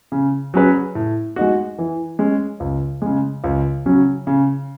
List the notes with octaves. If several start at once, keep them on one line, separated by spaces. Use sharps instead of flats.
C#3
F#3 C#4 G#4 B4
A2
G#3 D#4 F#4
E3
G#3 C#4
C#2
C#3 G#3
C#2
C#3 F#3 C#4
C#3